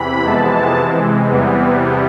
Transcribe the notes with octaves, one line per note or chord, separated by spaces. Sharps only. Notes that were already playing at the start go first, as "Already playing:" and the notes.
Already playing: E2 C3 E3 B5
F2 C3 E3 G#3 B3 A5
C3 E3 G#3
E2 C3 E3 G3 B3